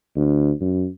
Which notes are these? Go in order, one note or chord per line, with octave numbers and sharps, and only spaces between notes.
D2
F#2